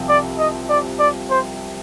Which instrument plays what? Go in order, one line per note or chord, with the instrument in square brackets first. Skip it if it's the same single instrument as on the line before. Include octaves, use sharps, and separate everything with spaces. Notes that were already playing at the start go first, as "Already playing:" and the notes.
Already playing: [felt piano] C2 C3 F3 C4
[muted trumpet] D5
D#5
D5
D5
C5